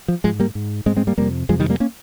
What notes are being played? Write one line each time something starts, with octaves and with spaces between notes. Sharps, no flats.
F3
G#2 F3 G#3
G3 A#3
G#2
G#2 G#3 C4
G#3 C4
G3 A#3
F2 C3 G3 A#3
F2 C3 F3 G#3
D#3 G3
G3 A#3
A#3 C#4